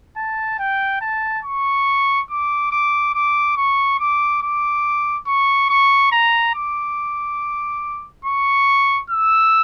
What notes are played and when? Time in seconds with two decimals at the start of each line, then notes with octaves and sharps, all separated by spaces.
0.17 A5
0.59 G5
1.02 A5
1.45 C#6
2.30 D6
2.72 D6
3.14 D6
3.57 C#6
4.00 D6
4.42 D6
5.27 C#6
5.70 C#6
6.12 A#5
6.55 D6
8.25 C#6
9.10 E6